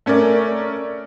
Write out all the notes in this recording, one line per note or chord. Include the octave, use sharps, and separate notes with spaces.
A3 C#4 A#4 D5